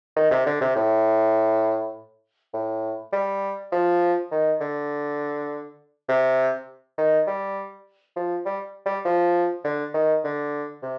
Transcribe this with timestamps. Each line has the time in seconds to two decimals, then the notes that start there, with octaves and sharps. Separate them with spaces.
0.16 D#3
0.31 C3
0.46 D3
0.61 C3
0.76 A2
2.54 A2
3.13 G3
3.72 F3
4.31 D#3
4.60 D3
6.09 C3
6.98 D#3
7.27 G3
8.16 F3
8.46 G3
8.86 G3
9.05 F3
9.64 D3
9.94 D#3
10.24 D3
10.83 C3